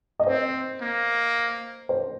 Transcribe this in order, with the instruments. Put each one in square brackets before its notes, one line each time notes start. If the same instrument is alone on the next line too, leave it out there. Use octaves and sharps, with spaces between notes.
[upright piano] D#5
[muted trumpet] C4 [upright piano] C5
[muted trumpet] A#3
[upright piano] C5